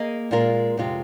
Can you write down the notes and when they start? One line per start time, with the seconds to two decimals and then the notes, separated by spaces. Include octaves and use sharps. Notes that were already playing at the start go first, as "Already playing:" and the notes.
Already playing: A#3 G#4 D#5
0.31 A#2 G#3 F4 A#4
0.77 F2 C3 G#3 F4